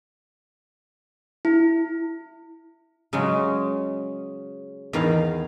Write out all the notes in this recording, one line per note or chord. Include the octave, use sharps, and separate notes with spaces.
E4
C#3 F#3 G#3
E2 D#3 F5